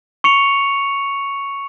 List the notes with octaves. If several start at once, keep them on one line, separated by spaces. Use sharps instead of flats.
C#6 C#7 F7